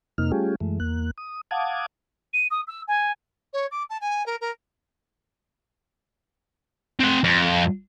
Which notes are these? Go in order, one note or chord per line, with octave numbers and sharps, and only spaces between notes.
F2 C3 A#3 D#4 F6
G3 A3 C#4 F4 G4 G#4
F#2 E3 G#3 A3
E2 A#3 F#6
D#6
F5 F#5 A5 D6 D#6 G#6
D#7
D#6
E6
G#5
C#5
D6
A5
G#5
A#4
A#4
C4 F#5
F2